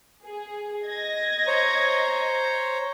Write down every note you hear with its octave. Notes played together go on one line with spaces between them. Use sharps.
G#4
D#5 G#6 A#6
C5 C#5 A#5